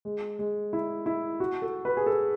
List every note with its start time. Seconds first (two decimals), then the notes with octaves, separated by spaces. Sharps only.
0.05 G#3
0.39 G#3
0.73 E4
1.06 E4
1.40 F#4
1.62 A4
1.85 B4
1.97 G#4
2.06 A4